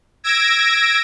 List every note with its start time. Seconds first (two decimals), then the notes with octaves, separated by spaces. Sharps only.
0.24 E6 G#6 A#6 D7